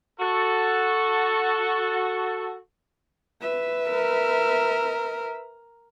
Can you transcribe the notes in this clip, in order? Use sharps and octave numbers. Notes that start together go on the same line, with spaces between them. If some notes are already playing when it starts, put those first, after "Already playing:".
F#4 A4
B4 E5
A#4